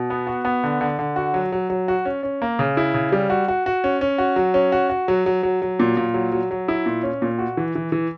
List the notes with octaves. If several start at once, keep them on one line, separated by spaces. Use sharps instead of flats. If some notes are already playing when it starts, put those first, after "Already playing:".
Already playing: B2
B3
F#4
B3
D3
D3
D3
F#4
F#3
F#3
F#3
F#4
C#4
C#4
A#3
C#3
E4
C#3
G3
F#4
F#4
F#4
C#4
C#4
F#4
F#3
C#4
F#4
F#4
F#3
F#3
F#3
F#3
A#2
A#2
F#3
F#3
F#3
E4
A#2
C#4
A#2
F#4
E3
E3
E3